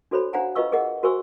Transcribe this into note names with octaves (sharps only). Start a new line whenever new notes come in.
D4 F#4 A4 C5 C#5 B5
D4 C5 F5 F#5 G#5 A#5
F4 B4 D#5 F5 C#6 E6
G#4 A#4 D#5 F#5
F#4 A#4 C5 G#5 C#6 E6